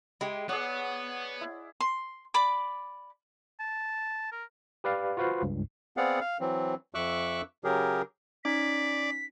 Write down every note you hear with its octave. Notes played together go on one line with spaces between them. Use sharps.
G#3 E4 G4
B3 G#4 C#5 D5 F#5
E4
C6
D5 B5 D6
A5
A#4
G4 B4 D5 F5
F4 F#4 B4 C5 F5
C#2 G2
B3 C4 G#4 D5 F5 F#5
F5
E3 F#3 C4
F2 E5 C#6 D6 E6 F#6
C#3 F#3 G4 G#4 A#4
C#4 D#4 D5 B6